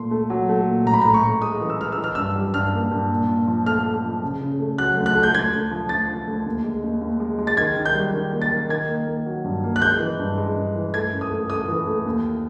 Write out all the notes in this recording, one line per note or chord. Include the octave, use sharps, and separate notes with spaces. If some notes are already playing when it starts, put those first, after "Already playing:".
Already playing: A#2 A3 C6
A3
F#3
A3
A#2
A2 A#5
B5
A2 A#5
C#6
A2
G#3 D#6
E3
E6
G#3 F6
E6
E3
F6
G2 E6
G3
G2 F6
A#3
G2
A#2
A#2
F3
A3 F6
A3
F3
C#3
C#3
A3
F#3 F#6
D2
F#6
A3
G6
D2 G#6
D2
F3
D2 A6
F3
D2
D#2
G#3
D#2
D#2
G#3
G#3
A6
D#3 G#6
D#3
G6
G3
D#3
A#3
A6
D#3
D#3 G#6
A#3
A#3
F#3
G2
A#3
F#6
G#3 G6
E3
G2
G#3
G2
E3
A3 G#6
F#2
D#6
A3
A3 D#6
E3
A3
D#2